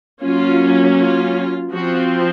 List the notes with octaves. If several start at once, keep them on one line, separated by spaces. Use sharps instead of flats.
F#3 A#3 C#4 F4
F4
F3 C4 F#4